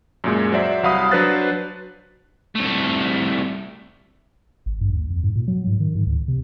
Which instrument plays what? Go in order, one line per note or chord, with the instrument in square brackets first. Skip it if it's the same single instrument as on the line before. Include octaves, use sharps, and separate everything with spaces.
[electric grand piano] F#2 A#2 G#3
F#3 C5 D5 E5
C2 F#3 F5 B5 D#6
F#3 D4 B4 C5 F#6 A6
[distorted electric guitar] C2 A3
[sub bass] G#1
G2
D#2
F2
G#2
A#2
F#3
G#2
D#3
G#2
D2
C3